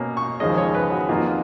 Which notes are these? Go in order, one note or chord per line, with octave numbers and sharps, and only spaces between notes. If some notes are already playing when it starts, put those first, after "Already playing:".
Already playing: B2 A#3 C#4
C#6
D#2 C#3 F3 G#3 C#4 D#5
C#5
B4
F#4
F2 D#3 A#3 F4